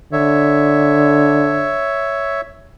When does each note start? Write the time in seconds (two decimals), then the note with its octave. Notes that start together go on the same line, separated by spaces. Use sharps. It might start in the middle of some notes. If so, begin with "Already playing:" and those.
0.13 D3 C#5 E5